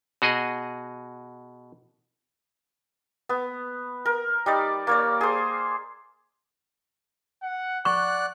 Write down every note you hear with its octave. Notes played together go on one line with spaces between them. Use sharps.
B2 F#4 G#4 D#5
B3
A#4
G3 D#4 D5
A#3 C#5 D5
G#4 C5
F#5
D5 F#5 C#6 F#6